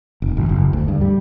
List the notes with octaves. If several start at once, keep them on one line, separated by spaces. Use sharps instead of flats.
F1
G#1
F#1
D2
G2
G3